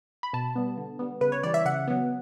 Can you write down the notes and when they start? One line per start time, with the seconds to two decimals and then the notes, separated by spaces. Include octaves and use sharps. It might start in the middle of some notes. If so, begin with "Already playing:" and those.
0.23 B5
0.33 B2 A5
0.56 G3 B3
0.77 D3
0.99 G3 B3
1.21 C#3 B4
1.32 C#5
1.43 E3 G3 D5
1.54 E5
1.65 C#3 F#5
1.88 F#3 B3